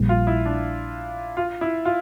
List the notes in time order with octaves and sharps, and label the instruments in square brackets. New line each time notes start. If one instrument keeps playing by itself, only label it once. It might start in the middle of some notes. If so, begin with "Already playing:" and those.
Already playing: [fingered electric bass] A#1 A#2 G3
[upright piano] F4
E4
D4
F4
E4
F4